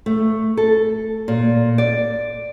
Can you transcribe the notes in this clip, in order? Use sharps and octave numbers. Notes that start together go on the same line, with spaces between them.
A3
A4
A#2
D5